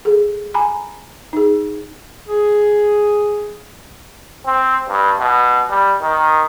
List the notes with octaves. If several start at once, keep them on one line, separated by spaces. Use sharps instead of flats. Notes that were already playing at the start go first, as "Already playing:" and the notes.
G#4 A4
G#5 A#5 B5
D#4 G#4
G#4
C4
G2
B2
G3
D#3